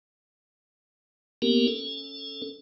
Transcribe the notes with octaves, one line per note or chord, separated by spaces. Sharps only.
A#3 B3 C#4 G4 A#4
C#4 A4